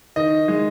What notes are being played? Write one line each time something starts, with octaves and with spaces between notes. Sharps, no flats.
D#3 D#5
G#3